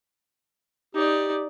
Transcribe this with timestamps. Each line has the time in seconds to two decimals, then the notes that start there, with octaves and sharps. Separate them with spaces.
0.95 D#4 G4 D5